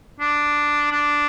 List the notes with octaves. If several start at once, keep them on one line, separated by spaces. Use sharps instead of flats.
D4
D4